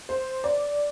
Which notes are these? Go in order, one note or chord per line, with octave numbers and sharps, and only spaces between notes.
C5
D5